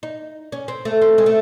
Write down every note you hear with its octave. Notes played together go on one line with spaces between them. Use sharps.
D#4
C#4
C4
A3
C4
G#3
A3